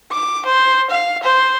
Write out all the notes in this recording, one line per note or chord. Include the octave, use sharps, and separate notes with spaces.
D6
C5
F5
C5